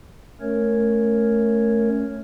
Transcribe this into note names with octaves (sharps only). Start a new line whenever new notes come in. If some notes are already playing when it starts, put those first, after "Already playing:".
A3 C#4 A#4 C#5